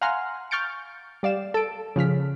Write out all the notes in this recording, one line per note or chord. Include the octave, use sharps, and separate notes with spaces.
F5 F#5 G#5 A#5 C6 F6
C#6 F6 G6 A6 C#7 D7
G3 D5 F5 E7
A4 D7
C#3 F3 F6 B6